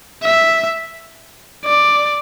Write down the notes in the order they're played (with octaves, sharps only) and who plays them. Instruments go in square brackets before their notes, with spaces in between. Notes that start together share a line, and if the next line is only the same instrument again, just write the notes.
[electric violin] E5
D5